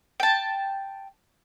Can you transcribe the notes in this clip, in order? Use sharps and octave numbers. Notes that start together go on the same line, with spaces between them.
G5 A5